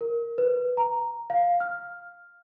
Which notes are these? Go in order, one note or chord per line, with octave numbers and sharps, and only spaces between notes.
A#4
B4
A#5
F5
F6